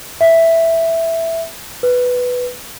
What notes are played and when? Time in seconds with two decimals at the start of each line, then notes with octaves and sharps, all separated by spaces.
0.21 E5
1.83 B4